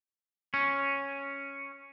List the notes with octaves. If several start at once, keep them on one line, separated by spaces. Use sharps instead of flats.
C#4